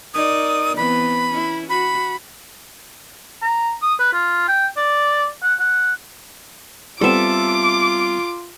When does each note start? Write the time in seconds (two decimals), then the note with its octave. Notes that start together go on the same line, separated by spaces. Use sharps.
0.14 D#4 A#4 D5 D#6
0.77 E3 B3 C4 B5
1.30 C#4 E4
1.69 F#4 B5
3.42 A#5
3.82 D#6
4.00 B4
4.13 F4
4.48 G5
4.77 D5
5.43 F#5
5.60 F#5
7.01 G3 B3 C4 F4 A4 E5 D6